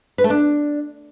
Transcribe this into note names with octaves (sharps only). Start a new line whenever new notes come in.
B4
A3
D4